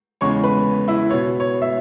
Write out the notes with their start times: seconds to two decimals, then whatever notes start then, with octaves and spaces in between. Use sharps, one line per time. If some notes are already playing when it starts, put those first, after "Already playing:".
0.21 E2 C#3 G#3 C#5 C#6
0.43 B4 B5
0.88 E4 E5
1.10 B2 B3 C#5
1.40 C#5
1.62 E5